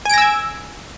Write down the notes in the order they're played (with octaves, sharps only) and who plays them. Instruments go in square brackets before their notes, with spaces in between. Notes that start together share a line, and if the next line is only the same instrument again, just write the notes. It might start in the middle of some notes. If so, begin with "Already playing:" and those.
[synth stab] G#5
D7
A#6
E6
G#6